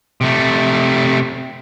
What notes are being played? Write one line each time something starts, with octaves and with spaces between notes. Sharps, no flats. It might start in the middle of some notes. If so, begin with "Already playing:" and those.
C3 A3